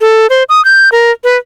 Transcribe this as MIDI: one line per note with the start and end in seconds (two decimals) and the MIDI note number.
0.01 0.27 69
0.30 0.44 72
0.49 0.64 87
0.65 0.89 91
0.92 1.11 70
1.24 1.37 71